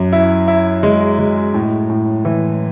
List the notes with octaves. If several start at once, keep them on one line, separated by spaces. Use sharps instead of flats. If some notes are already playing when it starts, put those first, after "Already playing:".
Already playing: F#2
E4
E4
G#3
G#3
A2
A2
E3